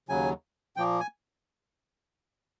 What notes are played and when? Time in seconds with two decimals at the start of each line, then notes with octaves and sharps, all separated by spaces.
0.09 D#2 C#3 F#3 G#5
0.76 A#2 F3 A#3 G5
1.00 G#5